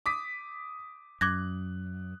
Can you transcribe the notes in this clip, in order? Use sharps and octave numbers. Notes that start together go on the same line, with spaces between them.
D6 D#6 B6
F#2 D6 F#6 G#6 A#6